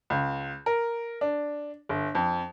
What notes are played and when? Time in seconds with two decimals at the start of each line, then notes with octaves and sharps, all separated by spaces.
0.10 C#2
0.66 A#4
1.21 D4
1.89 G1
2.15 F2